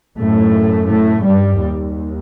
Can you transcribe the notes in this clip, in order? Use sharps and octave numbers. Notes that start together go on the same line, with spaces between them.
F#2 A2 A3
A2 A3
G2 G3
D#2